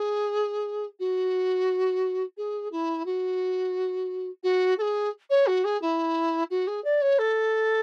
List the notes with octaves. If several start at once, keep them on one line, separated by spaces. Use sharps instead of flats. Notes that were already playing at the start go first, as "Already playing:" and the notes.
Already playing: G#4
F#4
G#4
E4
F#4
F#4
A4
G#4
C#5
F#4
G#4
E4
F#4
G#4
D5
C#5
A4